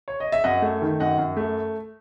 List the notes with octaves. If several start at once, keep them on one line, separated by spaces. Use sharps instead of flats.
C#5
D#5
E5
F#2 D#5 F#5
A3
D#3
F#2 D#5 F#5
F#2
A3